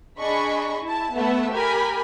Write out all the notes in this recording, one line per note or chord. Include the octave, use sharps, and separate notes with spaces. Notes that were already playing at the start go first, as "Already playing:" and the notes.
D4 G#4 D#5 B5 C#6
E4 A5
A3 B3 E5 F#5 A5 E6
G4 A#4 G#5 B5